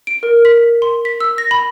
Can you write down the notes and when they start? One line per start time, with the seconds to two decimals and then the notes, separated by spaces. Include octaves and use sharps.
0.07 D7
0.23 A#4
0.45 B6
0.82 C6
1.05 B6
1.20 E6
1.38 A#6
1.51 B5